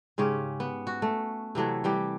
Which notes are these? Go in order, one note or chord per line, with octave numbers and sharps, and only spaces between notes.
G#2 C#3 C#4 G4
B3
F#4
A3
C3 E3 F#3 A3
E3 G3 G4